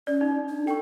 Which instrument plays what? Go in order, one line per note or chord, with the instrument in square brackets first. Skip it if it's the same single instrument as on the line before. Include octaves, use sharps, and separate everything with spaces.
[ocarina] C#4 [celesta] D5
[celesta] D#4
[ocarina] D4
[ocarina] A4 [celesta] G5 C#6